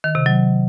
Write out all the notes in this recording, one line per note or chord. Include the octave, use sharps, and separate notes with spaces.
D#3
C3
F#3